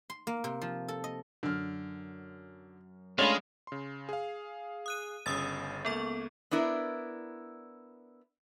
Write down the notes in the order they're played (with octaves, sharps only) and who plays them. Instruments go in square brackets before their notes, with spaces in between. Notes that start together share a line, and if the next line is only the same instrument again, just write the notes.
[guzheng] C6
A#3
C3
F3
A4
D#5
[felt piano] F#2 F6 [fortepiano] D3
[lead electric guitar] G#3 [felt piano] A3 C#4 D4 [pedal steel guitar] F4 [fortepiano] C#5 F5 B5
[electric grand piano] C#3 C6
G#4 F5
[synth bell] D#6 F#6 D#7
[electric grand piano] G1 C#3 [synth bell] D#6 E6 A6
[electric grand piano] C#2 A#3 [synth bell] B3 A4 C#6
[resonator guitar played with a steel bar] B3 D4 E4 A#4